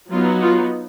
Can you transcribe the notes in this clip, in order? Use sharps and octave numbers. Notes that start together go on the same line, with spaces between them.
F#3 B3 D#4 F4
F4